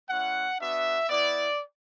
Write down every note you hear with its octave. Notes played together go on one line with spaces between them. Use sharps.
G#3 C#4 E4 F#5
B3 D4 F#4 E5
B3 E4 D5